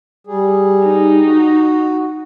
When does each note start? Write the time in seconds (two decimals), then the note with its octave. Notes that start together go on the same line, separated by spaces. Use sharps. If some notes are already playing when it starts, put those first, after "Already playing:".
0.27 G3 G#4
0.84 D#4
1.25 F#4